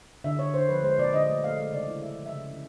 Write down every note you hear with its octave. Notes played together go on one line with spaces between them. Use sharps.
D3 E5
D3 C#5
D3 C5
F3 B4
G#3 C5
A#2 D5
D3 D#5
A3
A3 F5
G#3
C#3 D5
E3
C#3 E5
F3
E5
C#3
D3